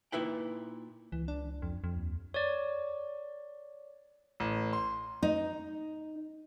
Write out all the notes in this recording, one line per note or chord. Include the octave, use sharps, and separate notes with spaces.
A#2 D#4 E4 B4 G5
C#2 E3
D4
F2
F2
D#2
C#5 D5
A1
C6
D#4